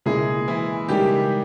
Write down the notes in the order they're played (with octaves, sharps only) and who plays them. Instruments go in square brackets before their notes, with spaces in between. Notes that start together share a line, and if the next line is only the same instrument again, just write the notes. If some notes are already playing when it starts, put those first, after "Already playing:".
[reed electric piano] C#2 B2 A#3 E4 [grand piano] G#3 G#4
[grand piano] E3 E4
[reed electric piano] C#3 G#3 D#4 A#4 [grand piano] G3 G4